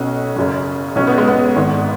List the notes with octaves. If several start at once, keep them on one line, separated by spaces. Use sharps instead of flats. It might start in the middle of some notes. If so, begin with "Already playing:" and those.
Already playing: B1 B2 C#4
F#1 F#2 C#3
B1 B2 C#4
B3
G#3
B3
G#1 G#2 D#3